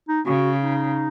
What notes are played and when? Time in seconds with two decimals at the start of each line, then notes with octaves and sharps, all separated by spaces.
0.08 D#4
0.26 C#3 F#4
0.61 D#4